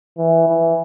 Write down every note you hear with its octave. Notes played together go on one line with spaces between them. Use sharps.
E3
E3